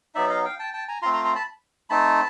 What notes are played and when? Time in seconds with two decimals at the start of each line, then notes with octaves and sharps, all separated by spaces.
0.15 F#3 B3 D#4 D5 E5
0.29 D#5 F5
0.45 F5 G5
0.59 G5 A5
0.73 G5 A5
0.88 G#5 A#5
1.02 F4 A#5 C6
1.05 A3 C4
1.13 A#5 C6
1.24 A#5 C6
1.35 A5 B5
1.90 A3 C4 D#4 A5 B5